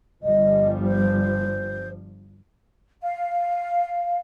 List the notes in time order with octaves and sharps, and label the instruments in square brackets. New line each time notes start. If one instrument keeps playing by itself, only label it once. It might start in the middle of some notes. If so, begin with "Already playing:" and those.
[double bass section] G1 F3 G3 [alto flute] D#5
[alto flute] C5
[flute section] F5